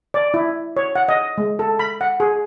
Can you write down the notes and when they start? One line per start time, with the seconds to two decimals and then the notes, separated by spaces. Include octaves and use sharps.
0.14 D5
0.34 E4
0.77 C#5
0.96 F#5
1.09 D#5
1.38 G#3
1.59 A4
1.79 B5
2.01 F#5
2.20 G#4